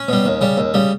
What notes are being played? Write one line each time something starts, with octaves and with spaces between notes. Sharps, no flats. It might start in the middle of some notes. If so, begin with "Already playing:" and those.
Already playing: C#4
B2 G3
D#2
C#3 G3
D#2
C#3 G3